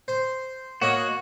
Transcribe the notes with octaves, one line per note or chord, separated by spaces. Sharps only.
C5
A#3 F#4 C#5 D#5